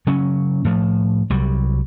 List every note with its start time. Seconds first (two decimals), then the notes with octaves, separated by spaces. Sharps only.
0.07 C#3 F#3 C#4
0.65 A2 F3
1.30 C2 F#3 G3